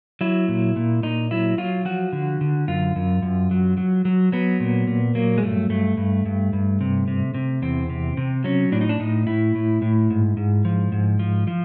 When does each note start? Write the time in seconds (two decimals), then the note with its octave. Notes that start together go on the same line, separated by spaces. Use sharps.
0.21 F#3 E4
0.48 A#2
0.76 A#2
1.03 A#2 D#4
1.31 F#3 E4
1.58 F#3 F4
1.85 F3 F#4
2.12 D3
2.41 D3
2.68 F#2 F4
2.96 F#2
3.22 F#2
3.51 F#3
3.77 F#3
4.05 F#3
4.32 F#3 B3
4.60 A#2
4.88 A#2
5.15 F#3 A#3
5.38 G#3
5.43 G2 A3
5.70 G2 A3
5.97 G2
6.26 G2
6.53 G2
6.81 C3
7.08 C3
7.34 C3
7.62 E2 C4
7.90 C3
8.17 C3
8.44 F#3 C#4
8.72 A2 D4
8.81 D#4
8.89 D4
9.00 A2 D#4
9.27 A2 E4
9.55 A2
9.82 A2
10.10 G#2
10.37 G#2
10.65 F3
10.92 G#2
11.19 F3
11.47 F3